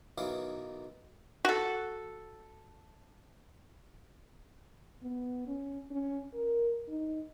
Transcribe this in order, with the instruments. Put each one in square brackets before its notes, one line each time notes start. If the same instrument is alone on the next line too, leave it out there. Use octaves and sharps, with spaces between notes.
[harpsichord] B1 D#3 E3 E4 C#5 F5
[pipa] F#4 A4
[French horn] B3
C#4
C#4
A#4
D#4